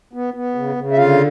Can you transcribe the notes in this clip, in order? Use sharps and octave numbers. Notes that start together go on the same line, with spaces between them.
B3
B3
C#3
C#3
E5
D3 F4 F5